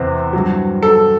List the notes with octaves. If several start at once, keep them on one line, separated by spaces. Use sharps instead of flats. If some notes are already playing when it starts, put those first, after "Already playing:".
Already playing: E2 C3 E3 C5
G2 F#3
A4